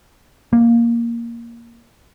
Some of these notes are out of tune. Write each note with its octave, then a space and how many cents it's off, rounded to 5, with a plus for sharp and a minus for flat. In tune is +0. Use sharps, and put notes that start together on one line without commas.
A#3 +5